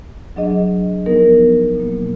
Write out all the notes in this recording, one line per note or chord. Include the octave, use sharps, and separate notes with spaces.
F#3 D4 G#4 D#5
F3 B3 D#4 A#4
B2 F#3 A#3